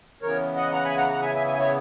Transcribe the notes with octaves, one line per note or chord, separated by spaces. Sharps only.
C#3 E3 B3 A#4 C#5
D#5 F#5
F#5 A#5
G#5 B5
F#5 A#5
F#5 A#5
E5 G#5
E5 G#5
E5 G#5
C#5 E5